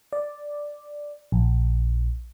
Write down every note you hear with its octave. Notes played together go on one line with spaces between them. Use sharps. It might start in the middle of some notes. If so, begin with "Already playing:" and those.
D5
A#1